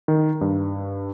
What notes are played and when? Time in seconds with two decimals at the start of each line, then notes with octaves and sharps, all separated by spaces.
0.08 D#3
0.41 G2